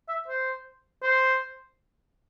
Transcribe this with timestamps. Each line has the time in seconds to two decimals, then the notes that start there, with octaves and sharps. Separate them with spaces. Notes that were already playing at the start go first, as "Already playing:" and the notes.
0.09 E5
0.28 C5
1.03 C5